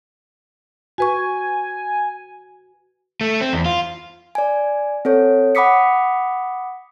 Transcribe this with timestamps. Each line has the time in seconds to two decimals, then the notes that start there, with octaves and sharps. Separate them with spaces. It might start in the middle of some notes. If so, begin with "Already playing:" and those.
0.98 F#4 B4 G#5 C#6
3.21 A3
3.41 C4
3.53 E2
3.65 F4
4.35 D5 G#5
5.05 C4 A4 C#5
5.55 F#5 B5 D6 D#6 B6 C#7